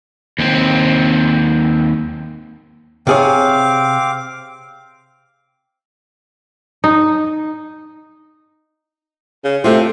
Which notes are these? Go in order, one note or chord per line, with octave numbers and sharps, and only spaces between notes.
D#2 C4
C3 C4 G#4 C#5 F5 D6
D#4
C#3
C3 A3 F4